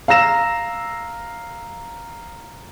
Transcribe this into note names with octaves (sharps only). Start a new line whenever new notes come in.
F5 A#5 E6 A#6 E7